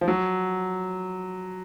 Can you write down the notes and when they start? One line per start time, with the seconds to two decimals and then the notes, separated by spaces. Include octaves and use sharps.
0.01 F3
0.08 F#3